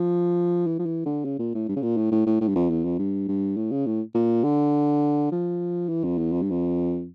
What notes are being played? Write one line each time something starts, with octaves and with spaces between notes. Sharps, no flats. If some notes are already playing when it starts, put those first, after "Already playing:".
Already playing: F3
E3
F3
E3
D3
C#3
A#2
A2
G2
C#3
A#2
A2
A2
A2
A2
G2
F2
E2
F2
G2
G2
A2
C#3
A2
A#2
D3
F3
E3
F2
E2
F2
G2
F2